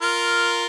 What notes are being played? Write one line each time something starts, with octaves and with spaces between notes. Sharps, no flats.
F4 A#4